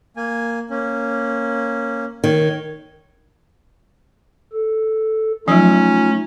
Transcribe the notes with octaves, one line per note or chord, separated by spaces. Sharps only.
A#3 G#5
A#3 C#4
D#3 C#5
A4
F3 F#3 A3 C#4 D#4 F4